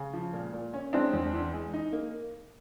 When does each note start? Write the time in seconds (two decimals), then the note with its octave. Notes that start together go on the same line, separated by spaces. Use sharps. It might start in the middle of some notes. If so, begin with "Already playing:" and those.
Already playing: C#3
0.13 F3
0.33 A#2
0.54 A#2
0.74 C#4
0.93 G#3 C4 D4
1.13 E2
1.33 E3
1.53 G#3
1.74 D#4
1.93 A#3